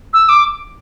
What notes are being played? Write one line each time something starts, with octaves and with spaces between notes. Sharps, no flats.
E6
D6